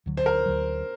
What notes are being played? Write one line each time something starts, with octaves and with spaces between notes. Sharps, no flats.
D2 D3 F#3
C5
A#4
D2 D3 F#3